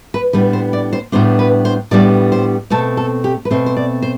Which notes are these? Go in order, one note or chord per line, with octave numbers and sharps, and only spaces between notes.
B4
A2 G3 B3 D4 B4
C5
D5
C5
A2 G3 B3 D4 C5
B4
C5
A2 G3 B3 D4 D5
C5
B2 A3 C4 A4
A4
G4
B4
B2 A3 C4 C5
C5
D5
C5